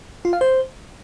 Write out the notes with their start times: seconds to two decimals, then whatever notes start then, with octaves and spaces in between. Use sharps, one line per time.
0.25 F4
0.33 F5
0.41 C5